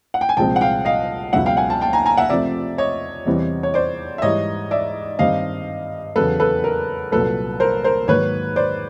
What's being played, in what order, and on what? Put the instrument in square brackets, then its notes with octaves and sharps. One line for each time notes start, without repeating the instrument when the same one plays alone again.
[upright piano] F#5
G5
G#5
C2 A#2 F3 G#3 C4 G5 A5
F#5
F5 G5
D#5 F5
C#2 B2 F#3 E5 F#5
F5 G5
F#5 G#5
G5 A5
G5 A5
G#5 A#5
G#5 A#5
E5 F#5
C3 F3 A3 C4 D5 E5
C#5 D#5
E2 C3 E3 G3 C4
C#5
C5 D5
E5
G#2 E3 G3 C#5 D#5
D5 E5
G2 D#3 G3 C4 D#5 F5
E2 C#3 F#3 A4 B4
A4 B4
A#4
C2 A#2 F#3 A4 B4
A#4 C5
A#4 C5
G#2 D#3 F#3 A#3 B4 C#5
C5 D5